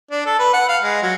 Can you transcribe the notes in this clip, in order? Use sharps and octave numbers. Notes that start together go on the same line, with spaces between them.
D4
A4
B4
F#5
F5
G#3
F#3